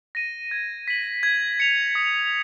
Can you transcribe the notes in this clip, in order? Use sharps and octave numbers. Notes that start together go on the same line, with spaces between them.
A#6 D#7
G#6
B6 F#7
G#6
C#7 F7
D#6